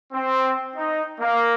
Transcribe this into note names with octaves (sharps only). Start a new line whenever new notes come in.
C4
D#4
A#3